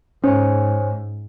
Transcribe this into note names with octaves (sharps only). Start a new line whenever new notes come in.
G#2 C#4 C5 C#5 G#5